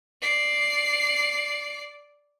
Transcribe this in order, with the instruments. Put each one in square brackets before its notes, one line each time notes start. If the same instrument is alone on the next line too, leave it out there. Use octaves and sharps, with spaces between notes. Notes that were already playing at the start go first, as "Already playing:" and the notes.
[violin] D5 C7